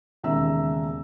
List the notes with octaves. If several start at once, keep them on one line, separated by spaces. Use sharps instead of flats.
E1 D#2 C#3 E5 A#5 E6